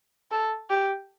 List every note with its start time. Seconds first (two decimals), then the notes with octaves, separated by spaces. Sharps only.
0.31 A4
0.70 G4